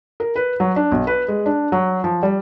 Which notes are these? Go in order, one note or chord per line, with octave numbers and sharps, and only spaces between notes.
A#4
B4
F#3
D4
B1
B4
G#3
D4
F#3
F3
G3